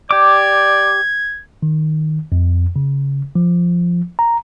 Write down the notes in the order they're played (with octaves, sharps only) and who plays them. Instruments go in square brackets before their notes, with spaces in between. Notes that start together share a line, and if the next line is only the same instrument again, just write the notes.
[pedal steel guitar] G4 D6 [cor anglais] D5 [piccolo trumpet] G#6
[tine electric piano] D#3
F2
C#3
F3
A#5